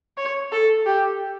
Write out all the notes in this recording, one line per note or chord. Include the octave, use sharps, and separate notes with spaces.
C#5
A4
G4